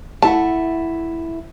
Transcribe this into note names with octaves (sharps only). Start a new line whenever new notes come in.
A3 E4 F#5 A5